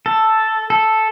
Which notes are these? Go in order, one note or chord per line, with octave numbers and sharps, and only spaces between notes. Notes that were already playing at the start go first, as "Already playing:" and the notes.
A4
A4